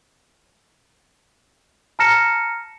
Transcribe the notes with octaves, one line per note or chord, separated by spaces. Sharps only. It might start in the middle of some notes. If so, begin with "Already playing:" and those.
A5 A#5 F6 A#6 C#7 E7